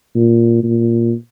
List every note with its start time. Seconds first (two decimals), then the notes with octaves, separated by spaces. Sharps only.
0.15 A#2
0.63 A#2